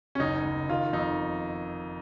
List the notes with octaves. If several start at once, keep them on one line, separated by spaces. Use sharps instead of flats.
C#4
F#1 D#4
F#1
D#3 F4
F2 D#4